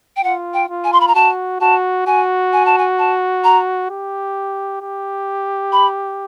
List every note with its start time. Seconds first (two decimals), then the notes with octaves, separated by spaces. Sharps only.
0.16 G5
0.23 F4 F#5
0.54 G5
0.69 F4
0.84 G#5
0.93 C6
1.00 B5
1.08 A#5
1.15 F#4 A5
1.60 F#4 A5
2.06 F#4 G#5
2.53 G#5
2.66 A5
2.78 G#5
2.99 A5
3.44 A#5
3.90 G4
4.81 G4
5.72 B5